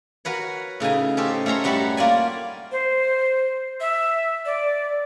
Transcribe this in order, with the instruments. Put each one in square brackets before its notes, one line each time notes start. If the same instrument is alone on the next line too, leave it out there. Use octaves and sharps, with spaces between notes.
[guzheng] F#4 A#4 B4 C#5
A2 C#3 D#4 G#5
C#4 G4 A4 C5
A3 C#4 C#5 A#5 C6
F#2 G3 F#4 A5 B5
A#3 F4 D5 G#5
[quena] C5
E5
D5